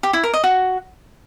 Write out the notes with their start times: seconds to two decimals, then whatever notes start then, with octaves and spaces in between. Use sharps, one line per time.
0.03 G4
0.13 E4
0.23 A#4
0.34 D#5
0.44 F#4